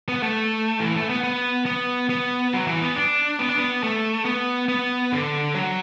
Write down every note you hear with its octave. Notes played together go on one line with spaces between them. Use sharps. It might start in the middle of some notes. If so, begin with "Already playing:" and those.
B3
A3
E3
A3
B3
B3
B3
B3
F#3
E3
B3
D4
B3
D4
B3
A3
B3
B3
D3
F#3